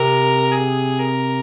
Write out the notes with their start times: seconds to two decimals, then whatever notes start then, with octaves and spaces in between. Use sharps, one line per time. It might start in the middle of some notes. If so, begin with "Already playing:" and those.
Already playing: C3 A#4
0.52 G#4
0.99 A#4